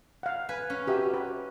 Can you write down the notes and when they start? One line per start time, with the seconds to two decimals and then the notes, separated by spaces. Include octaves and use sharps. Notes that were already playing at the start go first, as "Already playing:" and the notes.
0.23 F5 F#5
0.49 B4 G#5
0.70 C#4
0.87 D#4 F#4 G4 E5
1.14 B4